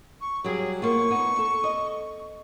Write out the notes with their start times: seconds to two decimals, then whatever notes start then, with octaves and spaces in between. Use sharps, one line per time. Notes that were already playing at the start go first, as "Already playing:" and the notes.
0.21 C#6
0.44 F#3 G3 G#4
0.82 A#3 B3 F4 C#6
1.10 B3 D#4
1.39 A4
1.64 D#5